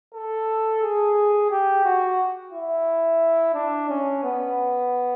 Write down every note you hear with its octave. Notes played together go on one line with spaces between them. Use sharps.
A4
G#4
G4
F#4
E4
D4
C#4
B3